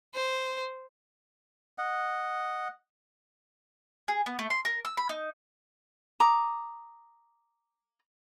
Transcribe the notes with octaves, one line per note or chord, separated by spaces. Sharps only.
C5
D#5 F#5
G#4
B3
A3
C6
A#4
E6
B5
D#4
A#5 D6 D#6